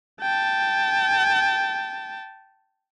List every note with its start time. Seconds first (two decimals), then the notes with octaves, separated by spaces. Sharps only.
0.22 G5 A5